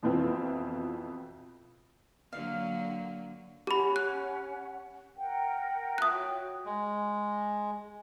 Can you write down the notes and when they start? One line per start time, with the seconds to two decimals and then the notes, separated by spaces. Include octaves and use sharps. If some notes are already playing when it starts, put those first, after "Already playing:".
0.03 F2 B2 E3 C4 F4
2.33 D3 F#3 A#3 F5
3.67 C#4 G4 F#5 B5
3.96 F#6
5.16 A#4 F#5 G5
5.98 F4 E5 A5 D#6 F#6
6.11 F#4 C#5 G5
6.65 G#3